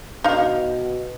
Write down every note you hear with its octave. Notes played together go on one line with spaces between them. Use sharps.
B2 D#4 F5